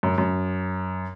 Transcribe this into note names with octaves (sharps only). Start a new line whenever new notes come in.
F#2
F#2